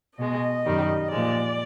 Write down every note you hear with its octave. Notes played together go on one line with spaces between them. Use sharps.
B2 G#3 D#5
F#2 D#3 G3
A#2 F3 G#3 D5